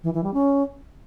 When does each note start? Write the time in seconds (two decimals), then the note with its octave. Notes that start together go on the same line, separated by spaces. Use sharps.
0.03 E3
0.13 E3
0.24 G3
0.34 C#4